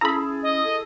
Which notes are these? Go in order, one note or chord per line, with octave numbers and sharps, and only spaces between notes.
C#4 E4 G#4 A4 A#5 B5
D#5
A4